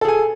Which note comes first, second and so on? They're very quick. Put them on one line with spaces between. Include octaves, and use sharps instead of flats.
A4 G#4 G#5